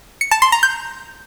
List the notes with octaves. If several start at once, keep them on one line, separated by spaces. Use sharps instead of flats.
C#7
A5
C6
A#5
G6